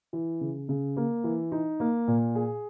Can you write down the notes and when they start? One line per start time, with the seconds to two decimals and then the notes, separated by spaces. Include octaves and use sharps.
0.13 E3
0.41 C#3
0.69 C#3
0.97 A#3
1.24 E3
1.52 D#4
1.80 A#3
2.08 A#2
2.35 G#4